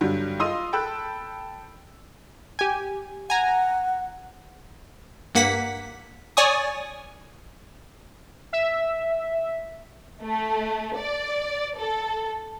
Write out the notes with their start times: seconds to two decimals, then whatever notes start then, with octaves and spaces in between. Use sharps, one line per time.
0.01 G2 D3 F#3 G3
0.39 F4 D#5 C6 D#6 E6 D#7
0.73 A4 G5 A5 B5 E6 F#6
2.59 G4 G#5
3.30 F#5 G#5 A#5
5.35 G2 A#3 F#5 B6
6.37 C#5 D5 G#5 C#6 D#6
8.53 E5
10.22 A3
10.97 D5
11.78 A4